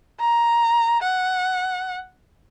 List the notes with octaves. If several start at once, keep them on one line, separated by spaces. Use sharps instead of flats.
A#5
F#5